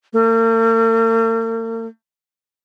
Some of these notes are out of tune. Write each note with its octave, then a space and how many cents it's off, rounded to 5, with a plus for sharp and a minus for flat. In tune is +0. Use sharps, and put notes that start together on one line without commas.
A#3 -45